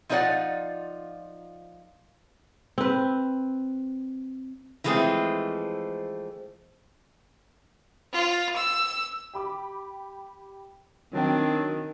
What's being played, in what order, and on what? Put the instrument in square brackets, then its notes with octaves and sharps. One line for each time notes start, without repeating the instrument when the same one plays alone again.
[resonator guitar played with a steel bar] F3 D#4 F4 B4 D5 F#5
[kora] C4 B4
[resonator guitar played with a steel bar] E3 F3 G#3 A3 C4
[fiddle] F4
E6
[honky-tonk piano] G4 B5 D6
[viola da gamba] D#3 [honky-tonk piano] F#3 G5 [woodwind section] C4 [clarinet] D4